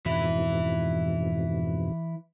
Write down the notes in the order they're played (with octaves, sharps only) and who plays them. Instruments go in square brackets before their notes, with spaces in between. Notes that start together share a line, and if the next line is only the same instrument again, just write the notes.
[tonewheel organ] F2 G#2 B2 [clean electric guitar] E3 E4